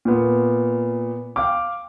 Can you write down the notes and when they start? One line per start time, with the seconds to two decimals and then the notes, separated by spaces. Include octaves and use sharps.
0.05 A#2 B3
1.36 F5 G5 D6